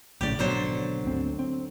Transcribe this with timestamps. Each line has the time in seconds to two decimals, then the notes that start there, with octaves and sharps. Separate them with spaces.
0.21 A#1 A2 C#3 G4 D5
0.39 G#1 B2 D3 F#3 C5
1.05 D2 C4
1.39 C4